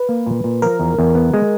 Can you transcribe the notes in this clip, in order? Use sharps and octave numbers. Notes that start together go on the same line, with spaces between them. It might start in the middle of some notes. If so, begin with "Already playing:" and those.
Already playing: B4
A#3
A#2
A#2
F3 A#4
E2
E2
B3
G#3